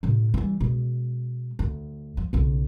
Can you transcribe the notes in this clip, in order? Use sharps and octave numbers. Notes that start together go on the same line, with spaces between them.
A2 C3
E3 G3
B2 G#3
D2
F3
B1 C#3